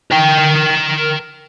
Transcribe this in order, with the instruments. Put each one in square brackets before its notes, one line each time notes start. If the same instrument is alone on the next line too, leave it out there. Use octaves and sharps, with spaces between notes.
[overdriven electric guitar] A#4 G5